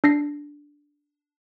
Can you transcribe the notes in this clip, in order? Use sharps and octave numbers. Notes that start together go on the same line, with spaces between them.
D4 A#6 C7